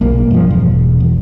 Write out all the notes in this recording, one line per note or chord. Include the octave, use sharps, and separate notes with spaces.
B1 A#3
G2 F3
E1
E2